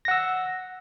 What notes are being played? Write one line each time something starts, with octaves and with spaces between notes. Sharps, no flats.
F#5 E6 A#6